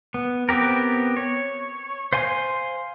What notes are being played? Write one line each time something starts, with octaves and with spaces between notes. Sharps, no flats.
B3
B3 C4 G4 A#4
C#5
C5 F5 G#5 C6